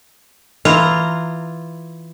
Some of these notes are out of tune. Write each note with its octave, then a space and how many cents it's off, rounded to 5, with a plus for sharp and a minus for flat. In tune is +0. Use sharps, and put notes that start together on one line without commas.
E3 +0 F4 +0 A#5 -15